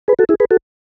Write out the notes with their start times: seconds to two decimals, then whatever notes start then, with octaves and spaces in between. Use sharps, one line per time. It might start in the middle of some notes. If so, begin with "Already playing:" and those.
0.08 G#4 B4
0.19 F#4 A4
0.29 E4 G#4
0.40 G#4 B4
0.51 F#4 A4